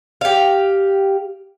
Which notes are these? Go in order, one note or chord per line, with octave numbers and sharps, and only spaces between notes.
G4 F5